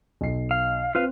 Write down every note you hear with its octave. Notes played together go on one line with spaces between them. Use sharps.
B1 C7
F5
C4 F4 B4 F5